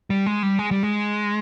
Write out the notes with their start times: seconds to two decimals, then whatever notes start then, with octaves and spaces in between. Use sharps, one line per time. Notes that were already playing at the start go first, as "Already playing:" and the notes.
0.10 G3
0.26 G#3
0.43 G3
0.59 G#3
0.71 G3
0.83 G#3